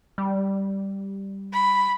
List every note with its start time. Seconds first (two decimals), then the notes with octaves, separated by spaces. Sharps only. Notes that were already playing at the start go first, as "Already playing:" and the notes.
0.18 G3
1.53 B5